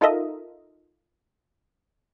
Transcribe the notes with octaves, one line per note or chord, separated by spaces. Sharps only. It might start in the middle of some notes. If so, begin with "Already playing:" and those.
D#4 F4 A4 A#4 D#5 E5